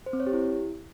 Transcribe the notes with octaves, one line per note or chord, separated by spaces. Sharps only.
C5
C4
C#5
G4
E4